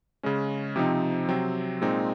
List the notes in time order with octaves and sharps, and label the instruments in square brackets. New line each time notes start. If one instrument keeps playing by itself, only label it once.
[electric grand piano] C#3 G#3 C#4
C3 F3 C4 D#4
C3 F#3 C4
A#2 G#3 C4 D#4